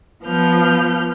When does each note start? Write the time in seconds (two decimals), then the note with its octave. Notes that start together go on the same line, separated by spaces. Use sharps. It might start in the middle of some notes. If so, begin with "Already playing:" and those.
0.23 F3 B3 F6 G6